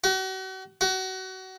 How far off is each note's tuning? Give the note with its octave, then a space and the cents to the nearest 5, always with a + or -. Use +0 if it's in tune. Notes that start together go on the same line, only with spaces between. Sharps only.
F#4 +40
F#4 +30